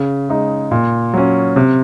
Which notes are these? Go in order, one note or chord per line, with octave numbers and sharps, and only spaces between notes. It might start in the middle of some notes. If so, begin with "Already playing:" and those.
Already playing: C#3
G#3 D#4
A#2
F#3 C#4
C3